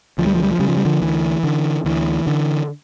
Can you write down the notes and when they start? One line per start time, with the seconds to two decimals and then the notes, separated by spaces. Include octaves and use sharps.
0.18 D2 F3
0.27 G3
0.35 F3
0.43 G3
0.51 F3
0.59 C#3 G3
0.69 F3
0.77 G3
0.85 D3 F3
1.02 D2 E3
1.43 D3
1.85 D2 E3
2.27 D3